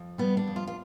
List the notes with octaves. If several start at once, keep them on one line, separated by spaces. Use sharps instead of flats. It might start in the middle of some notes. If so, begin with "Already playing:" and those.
Already playing: F2
G3 B3
D4
F2
F4
F4